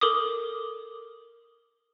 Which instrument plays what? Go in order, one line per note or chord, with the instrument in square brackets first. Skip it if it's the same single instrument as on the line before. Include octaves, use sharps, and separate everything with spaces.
[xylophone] A4 A#4 D6 D#6